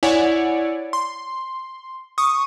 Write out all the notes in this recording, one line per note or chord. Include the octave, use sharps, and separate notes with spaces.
E4 C#5 D5 F#5 G#5
C6
C#6 D#6